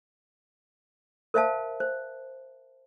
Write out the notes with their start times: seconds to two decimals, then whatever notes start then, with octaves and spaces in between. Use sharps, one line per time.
1.34 A#4 C5 E5 F5 A5
1.80 C5